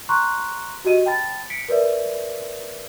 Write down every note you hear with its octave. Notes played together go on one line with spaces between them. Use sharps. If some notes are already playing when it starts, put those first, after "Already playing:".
A#5 C6 C#6 F#6
F#4 G4 D#5 D#7
G5 A5 B5 A6
B6 C#7 D7
A#4 B4 D5 E5